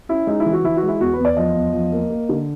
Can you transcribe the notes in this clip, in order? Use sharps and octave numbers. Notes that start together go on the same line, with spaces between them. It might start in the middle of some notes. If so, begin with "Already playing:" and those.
C#4 E4
G#3 D#4
E4
E3
F#4
E3 E4
F#4
G#3
E4
E2 F#4
B4
E2
D5
F3 D#5
E2
F3
A#3
A#3
D3